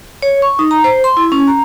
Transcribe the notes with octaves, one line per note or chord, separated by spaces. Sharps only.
C#5
C#6
D#4
A#5
C5
C6
E4
C#4
A#5